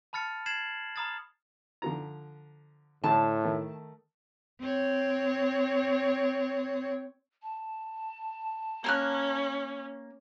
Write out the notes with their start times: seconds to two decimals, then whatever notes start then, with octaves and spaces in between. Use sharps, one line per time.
0.13 A5 B5 F6 A6 C#7
0.46 G#6 A6 C7 E7 F#7
0.96 A#5 B5 D#6 F6 A6
1.82 D3 F3 A#5
3.04 A2 D3 D4 A5
3.44 D#3 A3
4.61 C4 C#5
7.43 A5
8.84 A#3 C#4 F6 F#6